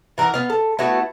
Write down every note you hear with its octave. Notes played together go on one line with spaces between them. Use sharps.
E3 A#4 F#5 A#5
B3 F5
A4
A3 B3 E4 F#4